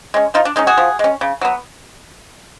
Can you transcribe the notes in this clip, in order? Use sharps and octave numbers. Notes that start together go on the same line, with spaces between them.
G#3 C#4
F3 D#4 F4
D4
G#3 C#4 D#4
F#4 G#4
F3
G#3 C#4
C#3
F#3 B3